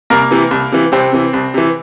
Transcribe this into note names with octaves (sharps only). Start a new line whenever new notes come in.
C2 A#3 A#4
C3 E3
C2
C3 E3
C2 C3 C4
C3 E3
C2
C3 E3